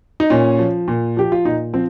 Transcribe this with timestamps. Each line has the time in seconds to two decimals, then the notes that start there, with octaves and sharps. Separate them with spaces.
0.20 D#4
0.30 A#2 C#4
0.59 F3
0.88 A#2
1.17 F3 G4
1.32 F4
1.45 A#2 D#4
1.73 F3 C4